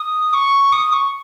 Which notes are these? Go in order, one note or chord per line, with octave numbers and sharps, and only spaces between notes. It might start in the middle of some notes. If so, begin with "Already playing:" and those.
Already playing: D#6
C#6
D#6
C#6